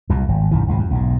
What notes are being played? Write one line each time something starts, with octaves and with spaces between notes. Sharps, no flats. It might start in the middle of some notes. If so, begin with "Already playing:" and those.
C2 F2 A#2
G#1
A#1 F#2 D#3 E3
G#1 C#2 C3
F2
B1 G#2